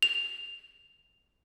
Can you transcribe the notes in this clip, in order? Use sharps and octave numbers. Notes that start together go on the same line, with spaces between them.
F7